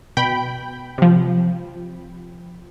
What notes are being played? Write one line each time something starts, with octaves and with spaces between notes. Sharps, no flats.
B2 G5 B5
C3 F3